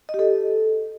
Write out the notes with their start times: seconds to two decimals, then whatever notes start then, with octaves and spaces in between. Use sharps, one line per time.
0.09 D#5
0.14 G4
0.19 A4